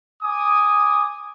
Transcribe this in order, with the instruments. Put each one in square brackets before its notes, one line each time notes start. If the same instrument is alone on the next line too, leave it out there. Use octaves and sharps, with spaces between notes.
[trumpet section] G#5 D6 D#6